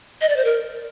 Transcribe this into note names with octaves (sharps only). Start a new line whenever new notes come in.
D#5
D5
C5
A#4